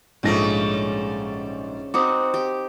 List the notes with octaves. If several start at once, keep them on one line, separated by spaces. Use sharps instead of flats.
A#1 G#2 C#3 G3 A3 A#6
C4 D#4 F#4 D6 D#6
G4